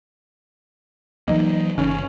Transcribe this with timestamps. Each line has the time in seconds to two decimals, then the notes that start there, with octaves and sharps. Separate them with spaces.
1.28 E3 F#3 A#3 D#4
1.78 G1 C#3 E3 C#4